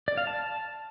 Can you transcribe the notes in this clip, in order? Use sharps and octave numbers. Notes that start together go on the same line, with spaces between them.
D5
F5
A5